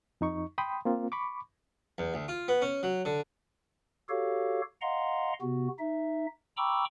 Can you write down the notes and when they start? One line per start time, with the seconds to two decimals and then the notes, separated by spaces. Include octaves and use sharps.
0.21 F2 D#4 C#6
0.58 G5 B5 C6 D#6
0.85 A#3 C4 F4
1.12 B5 C#6 D6
1.98 E2
2.14 D2
2.28 F4
2.48 B3
2.62 C#4
2.83 F#3
3.05 D3
4.09 F#4 G4 A4 C#5 F5
4.81 D#5 F5 F#5 A#5 C6
5.41 C3 B3 F#4
5.79 D#4 E5
6.57 G5 A#5 B5 C#6 D6 E6